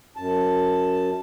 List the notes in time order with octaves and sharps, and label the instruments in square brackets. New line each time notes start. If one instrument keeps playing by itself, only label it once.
[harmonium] F#2 A5